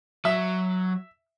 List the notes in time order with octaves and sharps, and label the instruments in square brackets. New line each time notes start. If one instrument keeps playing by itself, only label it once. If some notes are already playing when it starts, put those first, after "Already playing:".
[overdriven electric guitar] F#3 [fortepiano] E5